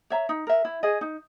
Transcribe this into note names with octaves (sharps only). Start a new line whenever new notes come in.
C#5 E5 A#5
D#4
A#4 E5
E4
G#4 D#5
D#4